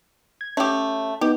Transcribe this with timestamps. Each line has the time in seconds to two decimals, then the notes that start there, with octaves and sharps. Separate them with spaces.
0.41 G#6
0.57 A3 C#4 G4
1.21 B3 D#4 G4